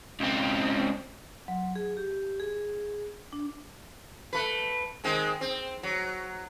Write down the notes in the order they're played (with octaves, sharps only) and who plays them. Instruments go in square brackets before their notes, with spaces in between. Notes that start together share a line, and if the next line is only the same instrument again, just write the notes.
[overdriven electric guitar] C#2 C4
[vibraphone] F#3
G#4
G4
G#4
D4
[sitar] A3 B4
D#3 G#3 C4
C4
F#3